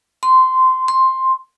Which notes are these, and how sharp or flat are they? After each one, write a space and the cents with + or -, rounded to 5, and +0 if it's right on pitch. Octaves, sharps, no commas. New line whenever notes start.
C6 -15
C6 +5